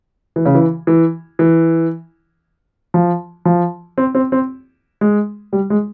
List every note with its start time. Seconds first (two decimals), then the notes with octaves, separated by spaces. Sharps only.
0.36 E3
0.46 C#3
0.55 E3
0.87 E3
1.39 E3
2.94 F3
3.45 F3
3.98 C4
4.15 C4
4.32 C4
5.01 G#3
5.53 G3
5.70 G#3